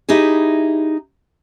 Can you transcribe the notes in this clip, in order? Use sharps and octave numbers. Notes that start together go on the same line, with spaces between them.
D#4 E4 G4 G#4